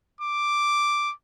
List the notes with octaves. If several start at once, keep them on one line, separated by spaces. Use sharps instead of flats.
D6